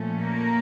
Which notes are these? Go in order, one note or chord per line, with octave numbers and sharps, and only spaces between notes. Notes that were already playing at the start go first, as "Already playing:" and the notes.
Already playing: A#2 F3 A3 C#4
A#3 A#4